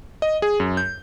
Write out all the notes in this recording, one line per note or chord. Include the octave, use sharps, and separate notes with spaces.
D#5
G#4
F#2
G6